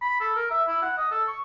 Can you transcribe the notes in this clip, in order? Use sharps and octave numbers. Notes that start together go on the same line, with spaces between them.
B5
A4
A#4
E5
E4
F#5
D#5
A4
C#6